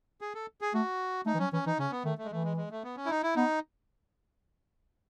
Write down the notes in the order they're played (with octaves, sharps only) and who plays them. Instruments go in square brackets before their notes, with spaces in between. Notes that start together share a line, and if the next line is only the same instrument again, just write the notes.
[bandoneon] G#4
A4
G#4
[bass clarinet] A3 [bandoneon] F#4
[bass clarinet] A3 [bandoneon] D#4
[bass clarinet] E3
[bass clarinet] F#3 [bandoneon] C#4
[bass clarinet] E3 [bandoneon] C#4
[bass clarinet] E3 [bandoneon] D#4
[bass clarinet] C#3 [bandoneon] C#4
[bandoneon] B3
[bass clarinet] D#3 [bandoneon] A3
[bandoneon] A3
G#3
[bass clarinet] E3 [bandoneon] A3
[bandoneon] G#3
G#3
A3
B3
C#4
E4
D#4
E4
[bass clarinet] B3 [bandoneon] D#4